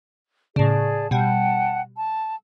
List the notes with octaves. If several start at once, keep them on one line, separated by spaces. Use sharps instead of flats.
A2 C#3 G#4 D5 A5
B2 G3 F#5 G5 A5
A5